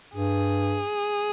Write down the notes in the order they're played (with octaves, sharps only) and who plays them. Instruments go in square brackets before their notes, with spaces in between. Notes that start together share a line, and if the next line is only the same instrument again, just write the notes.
[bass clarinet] G2 [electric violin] G#4